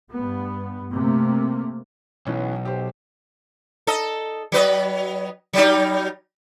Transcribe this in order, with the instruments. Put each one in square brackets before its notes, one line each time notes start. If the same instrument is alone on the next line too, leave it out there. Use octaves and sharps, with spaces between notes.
[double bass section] G2 B3
C3 A3 A#3
[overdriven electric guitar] B1 [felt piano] E3 B3 C#4
[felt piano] G4 C5
[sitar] A4 D#5
F#3 B4 D#5
F#3 G3 D#4